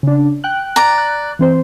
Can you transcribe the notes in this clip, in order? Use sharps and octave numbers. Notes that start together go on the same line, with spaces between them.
C#3 D4
G5 F#6
D5 A#5
F#6
E3 C4 C5